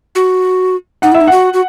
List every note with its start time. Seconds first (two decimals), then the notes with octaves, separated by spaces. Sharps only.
0.15 F#4
1.02 D#4 F#5
1.12 E4 E5
1.21 D#4
1.27 F#4 F#5
1.53 F#4